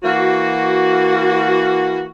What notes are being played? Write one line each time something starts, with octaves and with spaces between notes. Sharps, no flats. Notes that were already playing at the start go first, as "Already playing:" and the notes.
E3 A#3 F#4